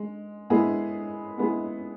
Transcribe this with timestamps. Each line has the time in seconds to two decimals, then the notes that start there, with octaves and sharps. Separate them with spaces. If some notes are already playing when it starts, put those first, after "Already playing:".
Already playing: G#3
0.50 G#3 B3 E4 G#4
1.38 G#3 B3 E4 G#4